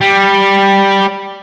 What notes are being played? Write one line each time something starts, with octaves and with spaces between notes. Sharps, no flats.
G3